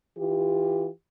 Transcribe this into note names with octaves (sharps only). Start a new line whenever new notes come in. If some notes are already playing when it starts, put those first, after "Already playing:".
E3 F4 G4